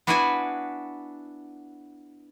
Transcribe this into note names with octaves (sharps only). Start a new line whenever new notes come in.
B3 D4 E4 F#4 B4 G#5